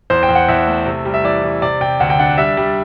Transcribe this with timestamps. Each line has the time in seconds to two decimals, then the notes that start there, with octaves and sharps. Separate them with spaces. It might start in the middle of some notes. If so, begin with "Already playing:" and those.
0.10 E2 C5
0.23 G5
0.29 E2
0.35 F#5
0.48 E2 E5
0.67 A3
0.86 C3
1.05 G3
1.14 E5
1.24 E3 D5
1.43 E3
1.62 C3 D5
1.81 C3 G5
2.00 D2 F#5
2.10 G5
2.19 D4 F#5
2.38 G3 E5
2.57 G3